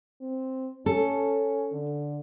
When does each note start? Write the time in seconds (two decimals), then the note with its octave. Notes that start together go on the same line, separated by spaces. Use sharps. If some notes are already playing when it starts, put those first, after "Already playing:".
0.21 C4
0.86 C#4 A4
1.73 D3